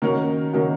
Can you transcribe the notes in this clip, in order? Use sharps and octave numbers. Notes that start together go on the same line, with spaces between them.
D#3 A#3 C#4 F#4 A#4
D#3 A#3 C#4 F#4 A#4